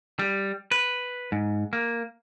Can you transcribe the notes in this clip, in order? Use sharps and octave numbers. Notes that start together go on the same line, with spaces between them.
G3
B4
G#2
A#3